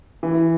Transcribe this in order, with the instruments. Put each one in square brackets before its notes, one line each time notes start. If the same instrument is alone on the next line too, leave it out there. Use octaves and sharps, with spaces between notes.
[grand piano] E3